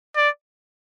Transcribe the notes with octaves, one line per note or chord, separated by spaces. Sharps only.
D5